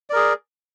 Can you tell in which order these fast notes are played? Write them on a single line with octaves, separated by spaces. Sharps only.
D5 A#4 G#4